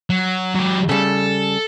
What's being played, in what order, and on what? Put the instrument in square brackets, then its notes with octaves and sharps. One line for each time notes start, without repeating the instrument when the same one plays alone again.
[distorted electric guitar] F#3
F#3 G4
[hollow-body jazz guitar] C#3 G3 [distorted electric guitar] A4